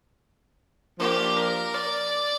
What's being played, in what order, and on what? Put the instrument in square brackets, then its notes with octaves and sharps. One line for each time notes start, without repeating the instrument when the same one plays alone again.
[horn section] F3 A#3 D4 [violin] G4
[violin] A#4
D5